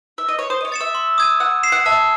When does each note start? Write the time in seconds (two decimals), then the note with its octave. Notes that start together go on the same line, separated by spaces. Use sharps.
0.18 E5
0.29 D#5
0.39 C#5
0.50 C5 D#6
0.61 D#5
0.65 C#5
0.72 A6 C#7 E7
0.81 E5
0.95 C6
1.18 D#6 G#6 D#7
1.40 F#5 E6
1.63 C7 E7
1.72 F#5
1.86 E5 A5